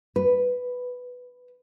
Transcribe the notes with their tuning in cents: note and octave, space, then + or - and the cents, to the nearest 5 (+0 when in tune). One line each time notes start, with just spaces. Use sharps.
B4 +5